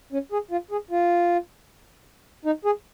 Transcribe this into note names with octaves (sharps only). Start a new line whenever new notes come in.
C#4
G#4
F4
G#4
F4
D#4
G#4